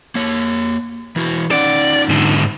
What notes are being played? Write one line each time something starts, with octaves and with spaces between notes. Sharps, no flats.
A#3 C#5
E3 E4 F#4
C#4 D#4 D5 F#5
G#2 D3